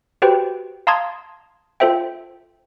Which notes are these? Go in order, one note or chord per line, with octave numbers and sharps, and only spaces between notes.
F#4 G4 B4 C5 G5
F5 A5 A#5 C6 D#6 G#6
F4 A4 C5 E5 G5